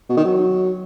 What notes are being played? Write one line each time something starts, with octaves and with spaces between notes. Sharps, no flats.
B2
D#3
F#3